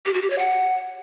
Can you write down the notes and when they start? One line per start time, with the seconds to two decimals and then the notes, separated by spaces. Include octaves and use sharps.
0.06 G4
0.14 F#4
0.22 G4
0.30 C#5
0.38 F#5